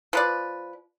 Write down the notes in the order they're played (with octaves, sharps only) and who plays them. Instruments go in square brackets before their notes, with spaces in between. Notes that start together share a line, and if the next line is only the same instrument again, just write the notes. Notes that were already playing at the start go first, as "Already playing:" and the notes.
[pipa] F3 B4 D5